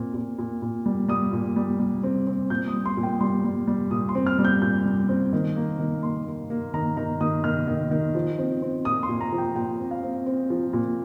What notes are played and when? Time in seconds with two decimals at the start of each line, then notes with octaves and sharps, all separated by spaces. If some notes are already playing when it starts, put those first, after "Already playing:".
Already playing: A#2 C4
0.14 A#2
0.38 A#2
0.62 A#2
0.86 G3
1.08 G3 D#6
1.33 A#2
1.56 G3
1.79 G3
2.03 C4
2.27 C4
2.50 A#2 G6
2.68 D#6
2.74 G3
2.86 C6
2.97 A#2
3.03 G5
3.20 G3 C6
3.44 G3
3.68 G3
3.91 A#2 D#6
4.09 C6
4.15 C4
4.27 F6
4.39 G3
4.45 G6
4.62 A#2 G6
4.86 G3
5.09 C4
5.33 D#3
5.56 A#3
5.79 D#3
6.03 A#3 C6
6.26 A#3
6.50 A#3
6.74 D#3 A#5
6.97 D#3 A#5
7.21 D#3 D#6
7.44 D#3 F6
7.67 D#3
7.91 D#3
8.15 F3
8.39 C4
8.62 C4
8.85 A#2 D#6
9.03 C6
9.09 A#2
9.21 A#5
9.32 F3
9.38 G5
9.56 A#2 G5
9.79 C4
9.91 F5
10.03 C4
10.26 C4
10.50 F3
10.73 A#2